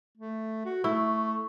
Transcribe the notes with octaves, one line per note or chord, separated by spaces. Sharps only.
A3
F#4
A3 E4 C#6